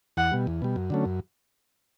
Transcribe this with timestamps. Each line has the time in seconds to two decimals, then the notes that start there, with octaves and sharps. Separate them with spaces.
0.17 E2 F#5
0.32 B2 G3
0.47 E2
0.62 B2 G3
0.76 F#2
0.90 D3 F#3 A3 C#4
1.05 F#2